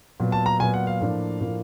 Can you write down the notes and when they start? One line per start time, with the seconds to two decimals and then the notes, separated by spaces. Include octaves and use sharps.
0.20 A#2 F#3 B3
0.32 A5
0.46 A#5
0.60 A#2 F#3 B3 G#5
0.74 F#5
0.87 F5
1.01 A2 F3 A#3 D4 F4
1.40 A2 F3 A#3 D4 F4